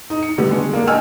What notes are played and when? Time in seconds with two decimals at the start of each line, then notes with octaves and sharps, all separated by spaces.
0.10 D#4
0.23 C#7
0.38 D3 G3 A3 B3
0.51 G#3
0.73 A#3 D4
0.87 D#5 G5 G#5 E6 F6